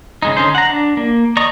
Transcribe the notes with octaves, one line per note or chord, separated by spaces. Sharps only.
C#3 G#3 D#4
D3 C#4 D#4 C5
F#5 A#5
D4
A#3
D5 D#5 A#5 C#6 D#6